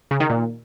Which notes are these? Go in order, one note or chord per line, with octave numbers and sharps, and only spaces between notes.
C#3
D#3
A#2